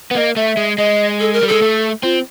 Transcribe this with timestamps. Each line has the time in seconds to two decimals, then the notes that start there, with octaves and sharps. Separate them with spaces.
0.11 B3
0.15 A#3 D#5
0.36 A3 E5
0.57 G#3
0.77 G#3 D#5
1.19 A4
1.33 A#4
1.43 G3
1.48 G#3 A4
1.62 A3
2.03 C4 F4